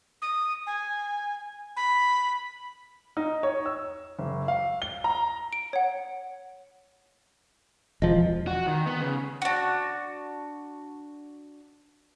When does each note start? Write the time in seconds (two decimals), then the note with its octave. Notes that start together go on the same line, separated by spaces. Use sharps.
0.22 D#6
0.67 G#5
1.76 B5
3.17 D#4
3.43 C#5
3.65 E6
4.19 F#1
4.48 F5
4.82 G7
5.04 A#5
5.53 D7
5.73 C#5 F#5
8.02 E1 F3 D#5
8.47 F#4
8.67 D#3
8.86 B3
9.01 C#3
9.42 D4 F#4